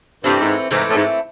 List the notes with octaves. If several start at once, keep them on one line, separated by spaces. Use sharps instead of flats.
G2 E3 A3 C4
G#2
G#2 E3 A3 C4
A2
G#2